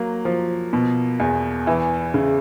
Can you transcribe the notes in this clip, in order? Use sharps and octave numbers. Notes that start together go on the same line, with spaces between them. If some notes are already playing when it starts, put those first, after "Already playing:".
Already playing: F#3 A#3
F3
B2
E2
E3
C#3